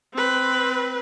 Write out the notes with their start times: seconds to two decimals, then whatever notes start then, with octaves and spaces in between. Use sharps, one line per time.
0.14 C4 B4